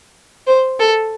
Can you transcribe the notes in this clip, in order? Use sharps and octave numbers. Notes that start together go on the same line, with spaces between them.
C5
A4